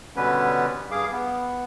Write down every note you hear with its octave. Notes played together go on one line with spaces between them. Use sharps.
B2 D3 G3 B3 C#4 B4
G2 G#4 F5 D6
B3